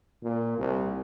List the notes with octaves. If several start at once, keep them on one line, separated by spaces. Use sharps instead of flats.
A#2
C2